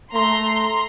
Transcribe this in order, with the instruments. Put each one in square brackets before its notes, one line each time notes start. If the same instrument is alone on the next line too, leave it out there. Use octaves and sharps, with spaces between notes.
[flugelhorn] A3 [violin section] A#5 C6